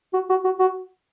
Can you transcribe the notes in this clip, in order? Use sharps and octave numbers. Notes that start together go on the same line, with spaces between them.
F#4
F#4
F#4
F#4